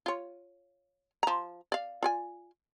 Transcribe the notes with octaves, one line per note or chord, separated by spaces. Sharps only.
F4 C#5
F3 A#5
D5 F5
F4 D5 G#5